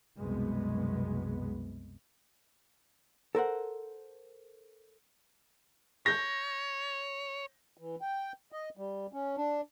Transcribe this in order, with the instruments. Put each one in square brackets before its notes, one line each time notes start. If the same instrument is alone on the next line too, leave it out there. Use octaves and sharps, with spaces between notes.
[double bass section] C2 F#2 B2 G#3 B3
[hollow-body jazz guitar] A4 A#4 C5 F#5
[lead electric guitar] C#5 [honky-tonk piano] G6 A#6
[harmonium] E3
G5
D#5
G3
C#4
D4